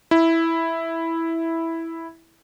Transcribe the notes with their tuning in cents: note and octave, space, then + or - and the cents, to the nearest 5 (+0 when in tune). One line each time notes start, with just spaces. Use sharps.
E4 -5